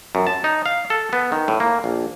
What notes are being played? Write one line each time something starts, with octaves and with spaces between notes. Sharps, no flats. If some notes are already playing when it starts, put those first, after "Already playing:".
F#2
A5
D#4
F5
A4
B3
D#3
A2
A#3
A#1